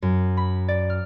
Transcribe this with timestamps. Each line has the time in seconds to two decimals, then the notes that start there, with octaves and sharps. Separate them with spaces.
0.02 F#2
0.37 B5
0.68 D5
0.90 F6